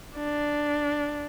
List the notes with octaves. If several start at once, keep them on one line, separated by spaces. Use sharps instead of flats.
D4